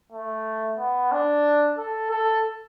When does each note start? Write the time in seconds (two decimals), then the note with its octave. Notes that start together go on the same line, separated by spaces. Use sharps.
0.13 A3
0.79 B3
1.12 D4
1.78 A4
2.10 A4